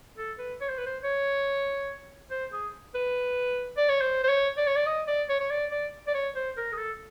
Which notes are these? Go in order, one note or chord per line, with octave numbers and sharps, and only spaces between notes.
A4
B4
C#5
C5
B4
C5
C#5
C5
G#4
B4
D5
C#5
C5
C5
C#5
D5
C#5
D5
D#5
D5
C#5
C#5
D5
D5
D5
C#5
C5
A#4
G#4
A4